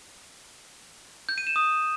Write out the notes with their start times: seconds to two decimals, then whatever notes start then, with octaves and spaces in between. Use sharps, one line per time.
1.29 G6
1.38 D#7
1.47 E7
1.56 D#6